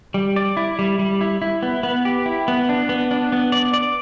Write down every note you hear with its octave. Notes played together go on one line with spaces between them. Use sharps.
G3
D5
E4
G3
G3
E4
E4
B3
B3
G4
E4
B3
D4
B3
D4
B3
D5
D5